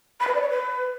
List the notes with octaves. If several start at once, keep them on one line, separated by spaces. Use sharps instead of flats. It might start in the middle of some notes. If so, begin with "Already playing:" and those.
B5
B4
D5
C#5
B4